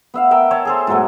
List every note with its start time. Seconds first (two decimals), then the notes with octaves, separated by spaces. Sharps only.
0.14 B3 E5 F5
0.31 A#4 E5 G5
0.51 C#5 E5 A5
0.65 G#4 A4 C5
0.87 G#2 B2 F#3 A3